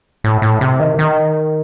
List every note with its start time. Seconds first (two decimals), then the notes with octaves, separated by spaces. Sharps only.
0.24 A2
0.42 A2
0.61 C3
0.80 D#3
0.99 D#3